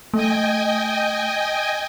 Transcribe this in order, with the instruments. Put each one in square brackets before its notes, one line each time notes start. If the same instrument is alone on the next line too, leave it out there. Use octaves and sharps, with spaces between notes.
[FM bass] A3 [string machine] D#5 G5 G#5